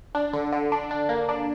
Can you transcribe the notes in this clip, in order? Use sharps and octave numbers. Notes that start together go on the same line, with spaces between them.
D4
D3
D3
D4
D4
A#3
D4